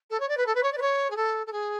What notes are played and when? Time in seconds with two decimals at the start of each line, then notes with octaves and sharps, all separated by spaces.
0.10 A4
0.20 C#5
0.29 D5
0.37 B4
0.46 A4
0.55 B4
0.63 C#5
0.73 D5
0.78 B4
0.82 C#5
1.11 G#4
1.16 A4
1.47 A4
1.52 G#4